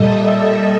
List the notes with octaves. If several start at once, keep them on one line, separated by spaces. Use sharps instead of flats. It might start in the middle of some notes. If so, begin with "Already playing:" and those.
Already playing: A#2 G3 A4 D#5 E5